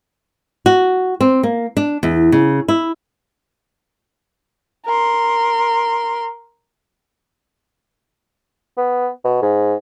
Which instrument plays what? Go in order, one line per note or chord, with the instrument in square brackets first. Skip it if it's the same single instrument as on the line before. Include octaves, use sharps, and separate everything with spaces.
[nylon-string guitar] F#4
C4
A#3
D4
E2
C#3
E4
[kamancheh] A#4 C6
[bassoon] B3
B2
G#2